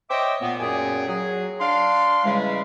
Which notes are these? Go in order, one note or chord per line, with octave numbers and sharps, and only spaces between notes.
C5 C#5 D#5 E5 G5 D6
A#2 B3
F#2 A#2 C#4 G#4 G5 G#5
F#3 G#4
D4 F5 C6
C#3 E3 G3 G#3